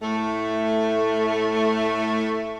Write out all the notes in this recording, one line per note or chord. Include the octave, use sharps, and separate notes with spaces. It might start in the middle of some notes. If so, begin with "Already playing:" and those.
A2 A3